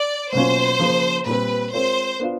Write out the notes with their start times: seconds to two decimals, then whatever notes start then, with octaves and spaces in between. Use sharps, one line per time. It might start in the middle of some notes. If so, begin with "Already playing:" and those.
Already playing: D5
0.33 B2 F#3 A#3 C#4 F4 C5
0.79 C#3 F3 A#3
1.26 A#2 G3 C4 B4
1.73 G#3 C4 F4 A#4 C5 C#5
2.20 B3 D4 F4